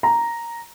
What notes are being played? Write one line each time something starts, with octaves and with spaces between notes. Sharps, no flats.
A#5